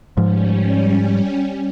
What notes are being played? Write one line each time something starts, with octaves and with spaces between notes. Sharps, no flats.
G#2 F3 G3 C#4